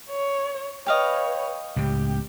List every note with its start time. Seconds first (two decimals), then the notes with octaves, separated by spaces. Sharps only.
0.10 C#5
0.86 B4 C#5 D#5 F5 G5
1.76 C#2 A2 C#3 G4